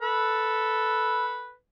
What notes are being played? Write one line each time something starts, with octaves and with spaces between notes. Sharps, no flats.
A4 B4